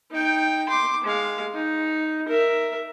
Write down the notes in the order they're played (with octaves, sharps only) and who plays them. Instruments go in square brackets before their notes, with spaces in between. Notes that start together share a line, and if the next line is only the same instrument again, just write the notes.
[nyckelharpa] D#4 G5
C6 D6
G#3 F5
D#4
A#4 E5